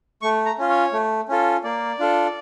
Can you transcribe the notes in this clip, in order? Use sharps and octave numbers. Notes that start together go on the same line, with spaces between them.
A3 C#6
A#5
C#4 F4
C#5
A3
C#4 F4 A4
A#3 D5
D4 F4 A4